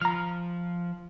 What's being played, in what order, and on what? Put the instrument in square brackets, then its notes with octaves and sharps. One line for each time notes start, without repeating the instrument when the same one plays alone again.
[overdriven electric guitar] F3 [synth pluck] A#5 F6